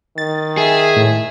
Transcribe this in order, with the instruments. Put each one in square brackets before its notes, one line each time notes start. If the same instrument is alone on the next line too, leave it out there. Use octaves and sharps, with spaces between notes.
[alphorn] D#3 [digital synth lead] A6
[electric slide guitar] G#4 [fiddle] E5
[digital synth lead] A2